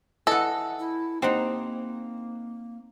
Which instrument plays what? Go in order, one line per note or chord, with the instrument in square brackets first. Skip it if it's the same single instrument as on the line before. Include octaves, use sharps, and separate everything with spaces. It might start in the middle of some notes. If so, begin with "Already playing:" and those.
[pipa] E3 [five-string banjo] A4 [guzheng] D#5 F#5
[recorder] E4
[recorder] A#3 [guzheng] C4 D#4 [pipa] G4 C5 F#5